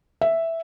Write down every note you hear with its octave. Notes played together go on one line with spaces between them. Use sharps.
E5